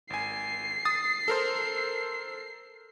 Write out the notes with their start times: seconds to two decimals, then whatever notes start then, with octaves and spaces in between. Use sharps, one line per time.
0.10 G#1 G#5 C7
0.85 D#6 A6
1.28 A4 A#4 C5